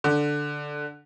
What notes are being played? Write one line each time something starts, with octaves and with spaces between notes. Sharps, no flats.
D3